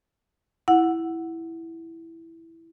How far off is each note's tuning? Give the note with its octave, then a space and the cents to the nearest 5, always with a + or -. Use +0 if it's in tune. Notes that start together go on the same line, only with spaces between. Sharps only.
E4 +0 F#5 +0